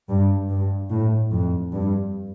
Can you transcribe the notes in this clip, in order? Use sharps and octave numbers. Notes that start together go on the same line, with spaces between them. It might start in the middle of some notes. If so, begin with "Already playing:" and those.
G2
G2
A2
F2
G2